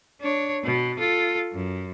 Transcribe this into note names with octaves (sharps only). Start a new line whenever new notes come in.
D4 C#5
B2
F4 A4
F#2